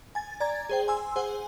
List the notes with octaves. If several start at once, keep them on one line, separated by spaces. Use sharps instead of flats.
G#5 A6
D5 A#5 G#6 A6
G#4 C5 G5
G#5 C6 E6
G#4 C5 F#5 G#5